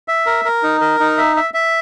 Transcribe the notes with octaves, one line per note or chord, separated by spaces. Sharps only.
E5
A#4
A#4
D#4
A#4
D#4
E5
E5
E5